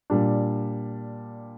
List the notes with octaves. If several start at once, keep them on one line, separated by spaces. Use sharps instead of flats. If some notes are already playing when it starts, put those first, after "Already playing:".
A#2 G3 D4